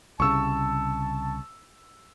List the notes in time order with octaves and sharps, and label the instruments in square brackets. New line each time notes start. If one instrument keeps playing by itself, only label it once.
[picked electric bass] C2 C#3 [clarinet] A5 [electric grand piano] C#6 E6